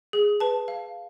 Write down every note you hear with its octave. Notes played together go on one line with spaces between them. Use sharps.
G#4
B4 A5
F5